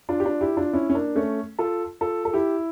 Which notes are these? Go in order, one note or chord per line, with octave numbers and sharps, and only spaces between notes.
D4 F4
G4
D4 F4
E4 G4
D4 F4
C#4 E4
C#4
A#3 D4
A3 C#4
F4 A4
F4 A4
A4
E4 G4